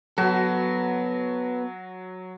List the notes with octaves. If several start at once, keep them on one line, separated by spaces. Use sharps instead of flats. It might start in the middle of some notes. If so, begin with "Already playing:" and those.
F#3 B3 F#4 A4